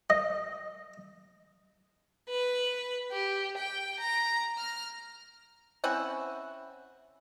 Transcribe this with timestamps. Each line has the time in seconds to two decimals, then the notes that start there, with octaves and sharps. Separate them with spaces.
0.10 D#5
2.29 B4
3.12 G4
3.58 G5
4.00 A#5
4.57 F6
5.84 C4 C#4 E4 F#5